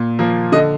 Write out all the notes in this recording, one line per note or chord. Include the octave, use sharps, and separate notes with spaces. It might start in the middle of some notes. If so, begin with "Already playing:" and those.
Already playing: A#2
F3 A#3
D3 D#5